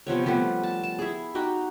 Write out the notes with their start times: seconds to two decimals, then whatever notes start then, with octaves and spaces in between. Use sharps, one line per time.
0.07 C3 F3 B3 C#5
0.26 F3 G3 A3 B3
0.63 A5
0.83 A5
0.99 E4 G#4
1.35 D#4 F#4 G4